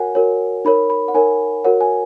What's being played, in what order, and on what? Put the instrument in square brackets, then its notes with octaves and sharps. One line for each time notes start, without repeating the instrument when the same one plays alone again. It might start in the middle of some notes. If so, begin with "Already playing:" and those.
Already playing: [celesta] F#4 A#4 C#5 F#5 G#5
F#4 A#4 C#5
D#4 A#4 C#5 B5
B5
F#5
D#4 A#4 C#5 G#5
F#4 A#4 C#5 F#5
G#5